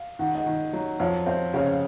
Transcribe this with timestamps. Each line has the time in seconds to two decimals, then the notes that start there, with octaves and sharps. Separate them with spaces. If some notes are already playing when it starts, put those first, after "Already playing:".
Already playing: F5
0.19 D#3 F#5
0.35 D#5 F#5
0.46 D#3
0.73 F#3
0.99 F2 C#5 F5
1.26 C4 C#5 F5
1.54 C#3 C#5 F5